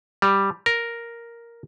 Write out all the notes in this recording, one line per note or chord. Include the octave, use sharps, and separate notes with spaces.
G3
A#4